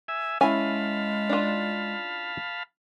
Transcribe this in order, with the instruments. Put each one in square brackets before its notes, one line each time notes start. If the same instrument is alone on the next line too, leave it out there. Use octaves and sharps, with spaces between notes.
[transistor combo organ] E5 G#5
[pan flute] G#3 [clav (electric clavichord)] C#4 E4 [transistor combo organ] F5 A5 B5 [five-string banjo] G#5
[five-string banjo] D4 F4